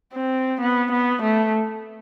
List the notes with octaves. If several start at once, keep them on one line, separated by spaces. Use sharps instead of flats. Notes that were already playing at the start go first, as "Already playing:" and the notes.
C4
B3
B3
A3